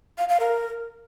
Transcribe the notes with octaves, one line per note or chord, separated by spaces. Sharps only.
F5
F5
A#4